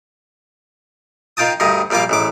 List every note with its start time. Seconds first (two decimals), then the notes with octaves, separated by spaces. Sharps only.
1.37 D#3 F4 G5 A5 D#6
1.60 D2 G2 D#3 D#5
1.90 A#1 G3 A#3 F4 D6
2.09 A1 G#2 D6